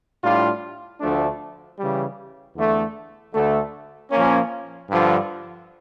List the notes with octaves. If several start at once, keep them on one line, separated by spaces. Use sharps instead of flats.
A2 G3 D4 F4
D2 D3 F3 A3 D4
C#3 E3 G3
E2 D3 A3
D2 D3 A3
A#2 F3 A#3 C#4
G2 D3 F3